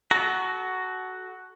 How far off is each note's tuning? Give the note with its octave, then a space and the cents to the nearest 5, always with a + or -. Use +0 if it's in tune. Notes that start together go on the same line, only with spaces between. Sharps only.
F#4 +10 A4 -30 A#5 +0